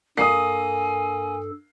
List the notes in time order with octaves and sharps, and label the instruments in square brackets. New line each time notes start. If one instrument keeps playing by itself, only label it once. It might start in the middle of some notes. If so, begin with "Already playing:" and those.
[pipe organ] G2 A4 [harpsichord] A#3 [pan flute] G#5 [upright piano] D#6 C7